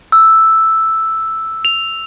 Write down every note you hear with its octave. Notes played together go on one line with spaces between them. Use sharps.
E6
F7